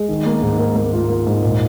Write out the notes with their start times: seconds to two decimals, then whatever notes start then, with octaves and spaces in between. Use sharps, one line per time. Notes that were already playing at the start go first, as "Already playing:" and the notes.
Already playing: G#3
0.09 D#3
0.26 A#3
0.43 G#2
0.59 A#3
0.75 A#3
0.93 F4
1.09 A#3
1.27 G#2
1.42 A#2